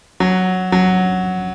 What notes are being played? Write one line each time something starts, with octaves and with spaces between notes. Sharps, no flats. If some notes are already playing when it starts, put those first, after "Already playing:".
F#3
F#3